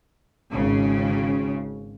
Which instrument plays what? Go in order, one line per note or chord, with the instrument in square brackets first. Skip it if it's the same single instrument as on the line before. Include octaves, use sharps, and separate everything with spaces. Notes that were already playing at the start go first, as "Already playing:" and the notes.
[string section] G#1 C#3